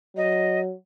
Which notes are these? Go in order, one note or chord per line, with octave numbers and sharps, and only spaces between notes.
F#3 D#5